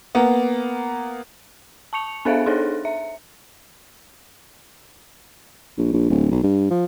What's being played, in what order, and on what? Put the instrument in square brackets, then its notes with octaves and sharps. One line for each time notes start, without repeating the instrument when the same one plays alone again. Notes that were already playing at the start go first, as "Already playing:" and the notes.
[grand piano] A#3 B3
[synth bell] A5 C#6 C#7 F7
B3 D4 A4 C5 E5 F5
D4 D#4 G#4 A4 C5 C#5
E5
[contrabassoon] A#1
A#1
D1
B1
G2
F3